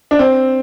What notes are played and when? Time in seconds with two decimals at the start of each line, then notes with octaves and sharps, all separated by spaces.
0.11 D4
0.19 C4